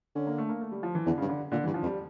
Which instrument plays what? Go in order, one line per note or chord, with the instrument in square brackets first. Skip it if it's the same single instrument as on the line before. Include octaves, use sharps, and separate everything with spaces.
[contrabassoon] D3 [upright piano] C#4
[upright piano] A#3
A3
A#3
A3
G3
F3
E3
[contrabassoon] E2 [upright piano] D3
[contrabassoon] G2 [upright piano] C#3
[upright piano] D3
[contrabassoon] A#2 [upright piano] D3
[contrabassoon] G2 [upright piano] E3
[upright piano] F3
[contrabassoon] F2
[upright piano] G3